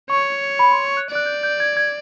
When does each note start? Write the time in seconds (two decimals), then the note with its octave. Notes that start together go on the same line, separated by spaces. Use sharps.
0.10 C#5 C#6
0.59 B5
0.72 C6
0.85 C#6
0.97 F#6
1.10 D5
1.15 F#6
1.26 G6
1.43 G6
1.60 G#6
1.77 G#6